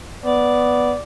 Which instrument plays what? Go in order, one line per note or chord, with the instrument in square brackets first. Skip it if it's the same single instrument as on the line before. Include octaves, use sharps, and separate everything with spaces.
[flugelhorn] B3 [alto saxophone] D5